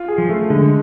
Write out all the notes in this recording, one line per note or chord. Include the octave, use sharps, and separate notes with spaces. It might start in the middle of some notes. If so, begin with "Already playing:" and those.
Already playing: F4
G#4
F3
A3
D3 G#3